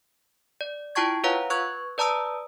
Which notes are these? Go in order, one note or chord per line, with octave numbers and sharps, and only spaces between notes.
D5
E4 F4 G5 A5 C#6 G#6
F4 B4 C#5 F5 F#5 A#5
B4 C#6 F#6 G#6
B4 D5 A5 A#5 D#6 E6